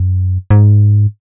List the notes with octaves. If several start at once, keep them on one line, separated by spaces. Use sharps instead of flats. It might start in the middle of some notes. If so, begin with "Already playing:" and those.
Already playing: F#2
G#2